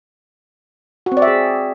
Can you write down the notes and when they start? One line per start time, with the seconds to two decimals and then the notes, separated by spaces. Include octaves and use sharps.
1.06 F#4
1.12 C4
1.17 D5
1.22 E5
1.27 G#4